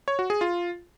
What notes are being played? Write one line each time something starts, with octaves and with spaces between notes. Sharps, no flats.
C#5
F#4
G#4
F4